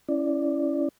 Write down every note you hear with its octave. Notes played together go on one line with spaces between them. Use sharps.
C#4 E4 D5